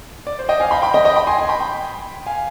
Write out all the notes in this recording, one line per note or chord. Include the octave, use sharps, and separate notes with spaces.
D5
C5
D#5 G5
F5 G#5
G5 B5
G5 B5
D#5 G5
D#5 G5
G5 B5
G#5 C6
G#5 C6
G5 B5
G5 B5
F5 G#5